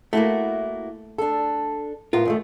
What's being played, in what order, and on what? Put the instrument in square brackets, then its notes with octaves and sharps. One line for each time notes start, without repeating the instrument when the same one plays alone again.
[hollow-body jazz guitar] A3 [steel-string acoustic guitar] A#3 E4 F#4
[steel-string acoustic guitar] D4 A4
[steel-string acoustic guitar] A2 B3 A#4 [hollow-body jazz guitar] F4
[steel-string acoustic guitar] F#2 D#3 A3